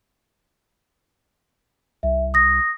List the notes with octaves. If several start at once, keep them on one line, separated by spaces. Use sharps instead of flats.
C2 E5
D#6 A#6